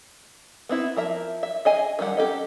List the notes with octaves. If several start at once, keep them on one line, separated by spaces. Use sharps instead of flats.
B3 C4 E4
F3 A#4 E5
E5
G#4 D#5 G#5
D#3 G3 G4 F#5
C#4 G4 A4 D#5